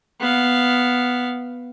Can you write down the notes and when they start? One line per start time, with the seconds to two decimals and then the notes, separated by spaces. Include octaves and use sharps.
0.20 B3 F5